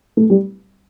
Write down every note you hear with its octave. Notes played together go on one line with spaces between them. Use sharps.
A3
G3